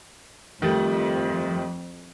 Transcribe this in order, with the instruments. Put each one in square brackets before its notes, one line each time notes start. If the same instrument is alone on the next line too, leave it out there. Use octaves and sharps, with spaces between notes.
[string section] F2 [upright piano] D#3 G3 A3